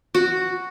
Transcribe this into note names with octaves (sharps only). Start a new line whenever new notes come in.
F#4